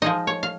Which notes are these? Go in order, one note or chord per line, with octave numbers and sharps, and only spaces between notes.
F3 G#3 D#4 D#5
C#5
F5